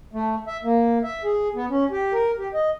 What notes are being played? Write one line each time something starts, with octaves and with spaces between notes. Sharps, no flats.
A3
E5
A#3
E5
G#4
B3
C#4
G4
A#4
G4
D#5